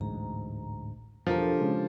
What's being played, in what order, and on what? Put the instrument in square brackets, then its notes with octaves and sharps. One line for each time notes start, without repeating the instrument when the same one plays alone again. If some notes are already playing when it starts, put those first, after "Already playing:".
[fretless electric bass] A1 D2 G#2 [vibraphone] A#5
[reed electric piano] E2 A#4 [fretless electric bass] B2 [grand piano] F3 [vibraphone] D4 G4 A4
[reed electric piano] C#3 G#3 C#4